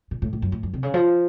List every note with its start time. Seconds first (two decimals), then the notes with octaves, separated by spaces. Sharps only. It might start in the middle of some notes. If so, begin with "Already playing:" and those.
0.11 A#2
0.22 A2
0.33 A2
0.42 F#2
0.52 A2
0.63 F#2
0.74 C3
0.83 C#3
0.94 F3